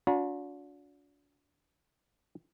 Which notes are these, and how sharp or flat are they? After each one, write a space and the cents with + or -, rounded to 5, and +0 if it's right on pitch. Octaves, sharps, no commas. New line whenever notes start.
D4 -35 F#4 -45 A#5 +35